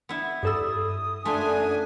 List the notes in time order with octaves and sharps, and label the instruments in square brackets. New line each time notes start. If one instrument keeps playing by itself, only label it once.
[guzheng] B3 E4
[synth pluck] G2 A4 E6 [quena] D#6
[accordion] F#2 D4 G#5 [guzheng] A3 F4